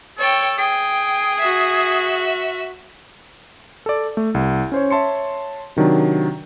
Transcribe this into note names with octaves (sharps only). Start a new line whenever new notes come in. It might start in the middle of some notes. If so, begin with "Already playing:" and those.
A4 C#5 G5
G#4 G5
F#4 E5
A4 D5
A3
C2
C#4 C5 C#5
C#5 E5 A5 C6 C#7
C3 D#3 F#3 D4